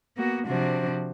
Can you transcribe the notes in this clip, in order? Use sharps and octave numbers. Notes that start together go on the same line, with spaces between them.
A#3 B3 F#4
C3 F3 D4 F#4 C5